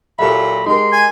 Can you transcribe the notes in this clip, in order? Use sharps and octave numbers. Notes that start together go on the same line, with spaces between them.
A#2 F#3 G4 A4 E5 B5
G#3 D#4 G4 A#4 C6
G#5